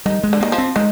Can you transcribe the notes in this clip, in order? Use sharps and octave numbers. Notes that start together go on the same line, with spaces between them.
D#3 G3
G#3
D3
D#3 A#3
F3
C4
D#3 G#3